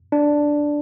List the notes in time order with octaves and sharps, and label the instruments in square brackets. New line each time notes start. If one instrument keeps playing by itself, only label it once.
[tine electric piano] D4